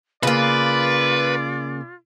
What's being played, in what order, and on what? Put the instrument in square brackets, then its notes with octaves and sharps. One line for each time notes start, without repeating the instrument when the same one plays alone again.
[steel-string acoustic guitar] C#3 A#3 [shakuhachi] F4 [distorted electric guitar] B4 [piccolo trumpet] D5